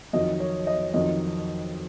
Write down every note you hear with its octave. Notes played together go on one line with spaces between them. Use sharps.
F2 D#3 F#3 D#5
C#5
D#5
F2 D#3 F#3 D#5